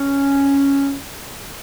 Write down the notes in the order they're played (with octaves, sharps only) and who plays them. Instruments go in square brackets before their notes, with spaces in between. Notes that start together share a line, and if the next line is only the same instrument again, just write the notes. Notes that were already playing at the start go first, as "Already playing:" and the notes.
Already playing: [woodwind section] C#4